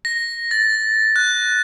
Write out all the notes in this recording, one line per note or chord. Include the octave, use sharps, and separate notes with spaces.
A#6
A6
F#6